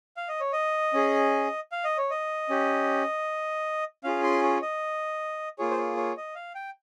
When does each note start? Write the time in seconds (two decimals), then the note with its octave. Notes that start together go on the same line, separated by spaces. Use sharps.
0.17 F5
0.28 D#5
0.40 C#5
0.53 D#5
0.93 C#4 G#4
1.72 F5
1.84 D#5
1.98 C#5
2.10 D#5
2.49 C#4 G4
4.04 C#4 F4 G#4 F5
4.23 C6
4.43 C#5
4.62 D#5
5.58 A#3 F4 G#4 C#5
5.71 C5
5.78 C#5
5.97 C#5
6.17 D#5
6.35 F5
6.55 G5